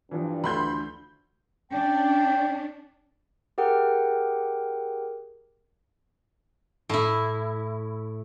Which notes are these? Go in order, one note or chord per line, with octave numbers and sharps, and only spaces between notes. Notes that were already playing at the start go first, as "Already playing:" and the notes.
G2 E3 F3
D2 D3 B5 C6 G6
C#4 D4 G5
G4 G#4 A#4 F#5 G5
A2 E4